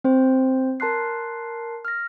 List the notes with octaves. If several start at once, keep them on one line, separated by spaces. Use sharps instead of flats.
C4 C5
A#4 A5 C6 F#6 C7
F6 A#6